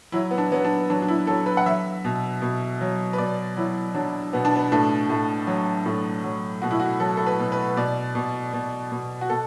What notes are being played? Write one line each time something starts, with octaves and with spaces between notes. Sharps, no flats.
F#3 E4
B3
D4
F#3 B3
D4
F#3 D4
D4
E4
F#3 A4
B4
F#5
F#3 E5
B2
B2
F#3
B4
B2 D5
F#3 E4
F#3 D4
B2 B3
D4
B3
A2 D4
A2
F#3
A2
F#3
B2 F#4
E4
F#4
F#3 A4
A4
B4
B2
B4
B2 D5
B2
B2
B2
F#4
B2 A4